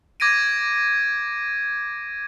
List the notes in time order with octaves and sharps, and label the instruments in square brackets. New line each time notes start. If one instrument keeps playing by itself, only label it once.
[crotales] D6 G#6 A#6 D7 D#7